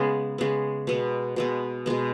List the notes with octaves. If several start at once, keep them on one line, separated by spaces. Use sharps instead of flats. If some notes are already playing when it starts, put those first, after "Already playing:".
Already playing: C#3 G#3 B3
C#3 G#3 B3
B2 G#3 B3
B2 G#3 B3
B2 G#3 B3